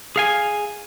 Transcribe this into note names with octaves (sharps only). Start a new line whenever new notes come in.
G#4 F5 G#5